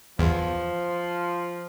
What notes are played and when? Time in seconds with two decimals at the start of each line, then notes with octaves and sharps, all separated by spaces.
0.19 E2 F3